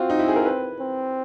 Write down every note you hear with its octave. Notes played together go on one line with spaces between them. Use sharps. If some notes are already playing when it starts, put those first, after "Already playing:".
Already playing: C4 F4 F#4
D#4
E4
G#4
A#4
B4
C4